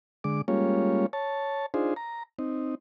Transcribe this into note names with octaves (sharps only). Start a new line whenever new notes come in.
D3 G#3 D6
G3 G#3 A#3 C#4 F4 C#5
C#5 A5
D4 D#4 F4 G#4 C5
A#5
C4 D#4